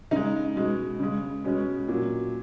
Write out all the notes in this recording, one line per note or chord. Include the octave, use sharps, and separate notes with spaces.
C#3 G#3 D#4
B2 G#3
C#3 G#3
B2 G#3 C#4
A#2 F#3